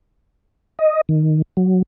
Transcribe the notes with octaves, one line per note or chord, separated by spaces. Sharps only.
D#5
D#3
F#3